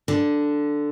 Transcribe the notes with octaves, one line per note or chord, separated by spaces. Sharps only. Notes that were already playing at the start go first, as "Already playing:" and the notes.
D3